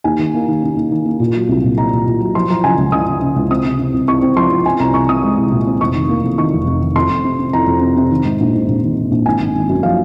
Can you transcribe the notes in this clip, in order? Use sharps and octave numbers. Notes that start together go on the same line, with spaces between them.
D#2 G#5
D#3
A#3
D#3
C#4
D#2
D#3
A#3
A#2
F#3
C2
A#2
A#2 A#5
A#2
A#2
F#3
F3 C6
F3 A#5
C#3 G#5
C#2
C#3 D#6
C#3
C#3
C#2
C4 D#6
C3
C3
C2
C4 C#6
C4
F3 C6
C4
C4 G#5
C2 A#5
C2 C#6
C4 D#6
G#3
C2
A#2
C4
F1 C#6
D#3
A#3
F2
D#3 C#6
F1
F1
D#3
F2 C6
F2
C3
C3
F2 A#5
F2
C3
C3
D#3
G#2
A#1
G#2
A#1
D#3
A#1
A#1
G#1 G#5
G#1
G#1
F#2
F3 F5